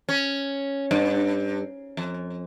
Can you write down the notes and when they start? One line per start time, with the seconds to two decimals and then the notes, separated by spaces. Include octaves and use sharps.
0.09 C#4
0.91 G2
1.97 F2